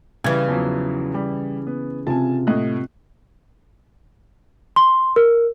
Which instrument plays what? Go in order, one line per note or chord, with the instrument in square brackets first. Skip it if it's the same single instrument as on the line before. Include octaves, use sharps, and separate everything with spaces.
[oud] C#3 E3 [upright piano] G3 [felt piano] G#6
[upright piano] E2 F3 F#3
G3
B3
[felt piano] C3 F4 [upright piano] G#5 A5
[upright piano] A2 D#5 F#6
[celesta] C6
A#4